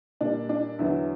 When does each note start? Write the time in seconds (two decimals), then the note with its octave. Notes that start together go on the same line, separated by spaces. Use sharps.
0.21 A#2 G3 D4
0.49 D4
0.79 E2 D3 F#3 E4